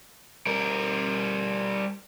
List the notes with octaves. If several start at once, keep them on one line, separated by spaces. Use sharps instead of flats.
G3 A#4